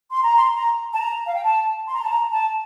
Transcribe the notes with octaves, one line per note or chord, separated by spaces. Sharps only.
C6
A#5
C6
A#5
A5
A#5
F5
G5
A5
C6
A#5
A5
A#5
A5